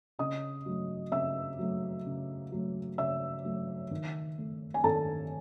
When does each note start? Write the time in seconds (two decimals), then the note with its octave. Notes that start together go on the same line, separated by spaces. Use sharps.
0.19 C#3 D#5 D#6
0.66 F#3 A3
1.12 C#3 E5 E6
1.59 F#3 A3
2.06 C#3
2.52 F#3 A3
2.98 C#3 E5 E6
3.45 F#3 A3
3.91 D#3
4.38 A3
4.74 G#5
4.84 D#3 A4 A5